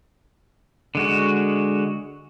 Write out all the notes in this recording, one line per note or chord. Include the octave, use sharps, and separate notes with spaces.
D3 G#3 F#4